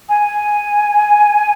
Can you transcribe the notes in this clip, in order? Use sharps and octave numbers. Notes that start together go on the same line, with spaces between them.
G#5